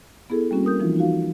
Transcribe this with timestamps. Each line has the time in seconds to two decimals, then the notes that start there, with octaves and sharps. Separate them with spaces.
0.30 B3 E4 G#4 A4
0.51 G3 A#3 C4 C#4 F#4
0.63 C#4 A#4 D#6 G6
0.80 E3 F3 D#4 F4
0.96 D#4 F4 F#4 F5